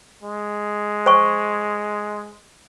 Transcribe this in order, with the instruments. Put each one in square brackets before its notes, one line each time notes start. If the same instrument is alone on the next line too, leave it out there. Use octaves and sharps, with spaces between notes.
[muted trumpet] G#3
[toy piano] C5 G#5 C#6